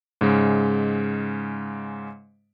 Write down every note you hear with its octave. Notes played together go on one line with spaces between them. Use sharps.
G#2 C#3 G#3